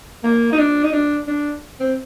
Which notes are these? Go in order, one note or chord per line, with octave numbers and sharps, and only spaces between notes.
A#3
D#4
D4
D#4
D4
D4
C4